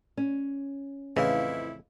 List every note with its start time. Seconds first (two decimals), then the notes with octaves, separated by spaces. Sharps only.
0.17 C#4
1.16 A1 F2 C#3 E4 B4 D#5 F5